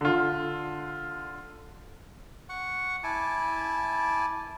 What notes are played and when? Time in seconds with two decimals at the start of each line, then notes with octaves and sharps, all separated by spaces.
0.01 D3 F4
2.49 F#5 C#6
3.03 E4 G#5 A5 D6